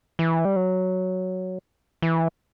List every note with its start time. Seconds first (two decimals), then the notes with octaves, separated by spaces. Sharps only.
0.19 E3
0.45 G3
0.56 F#3
2.02 E3